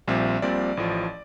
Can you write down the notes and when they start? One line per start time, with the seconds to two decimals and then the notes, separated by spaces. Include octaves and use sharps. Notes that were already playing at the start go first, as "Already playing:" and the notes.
0.07 A#1 A#2 G3 C4 E5
0.42 A#1 A#2 G3 C4 D5
0.77 A1 A2 F3